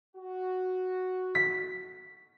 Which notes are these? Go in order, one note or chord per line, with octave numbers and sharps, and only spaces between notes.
F#4
B6